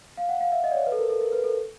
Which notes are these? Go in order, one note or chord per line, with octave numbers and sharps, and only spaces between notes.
F5
F#5
F5
E5
D#5
D5
C#5
B4
A4
A#4
A4
A#4
B4
A4